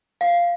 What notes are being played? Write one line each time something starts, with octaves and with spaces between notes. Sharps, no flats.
F5